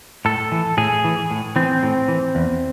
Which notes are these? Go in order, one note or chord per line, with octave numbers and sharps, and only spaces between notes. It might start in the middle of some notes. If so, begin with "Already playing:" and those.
A2 A4
E3
A2 G#4
E3
A2
E3 C4
A2
E3
E2